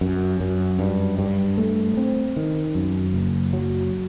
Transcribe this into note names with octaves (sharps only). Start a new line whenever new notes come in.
F#2
F#2
G2
G2
A3
C4
D#3
F#2
F#1
F#3